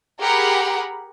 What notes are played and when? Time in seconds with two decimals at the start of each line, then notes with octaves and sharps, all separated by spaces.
0.20 G4 G#4 A#4 F#5 B5